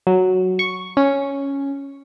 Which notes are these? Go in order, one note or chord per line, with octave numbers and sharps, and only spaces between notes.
F#3
C#6
C#4